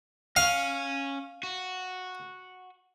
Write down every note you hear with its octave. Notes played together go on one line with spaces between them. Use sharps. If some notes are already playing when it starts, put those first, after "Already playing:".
C#4 F5
F#4